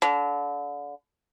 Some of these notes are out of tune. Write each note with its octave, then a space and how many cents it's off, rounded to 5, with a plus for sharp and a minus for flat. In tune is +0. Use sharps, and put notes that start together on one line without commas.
D3 -30